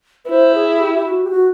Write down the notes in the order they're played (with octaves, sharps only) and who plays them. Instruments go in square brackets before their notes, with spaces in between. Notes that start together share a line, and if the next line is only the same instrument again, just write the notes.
[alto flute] B4
[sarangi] E4 [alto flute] C5
[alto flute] G#4
G4
G4
F#4
G4
F#4